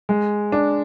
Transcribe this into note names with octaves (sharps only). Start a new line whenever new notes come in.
G#3
D4